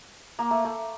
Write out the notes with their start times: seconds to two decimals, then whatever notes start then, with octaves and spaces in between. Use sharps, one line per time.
0.39 A#3
0.51 A3
0.65 A3